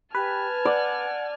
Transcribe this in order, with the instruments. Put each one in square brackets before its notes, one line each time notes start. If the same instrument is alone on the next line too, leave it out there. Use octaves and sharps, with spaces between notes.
[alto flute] G4 [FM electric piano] B4 [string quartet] G#5 A5 F6
[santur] D5 [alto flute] F#5